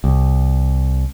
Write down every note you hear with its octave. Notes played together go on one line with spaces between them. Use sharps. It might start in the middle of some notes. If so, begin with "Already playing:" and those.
C2